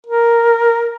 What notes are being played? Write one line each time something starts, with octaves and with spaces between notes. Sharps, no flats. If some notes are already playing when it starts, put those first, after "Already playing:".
A#4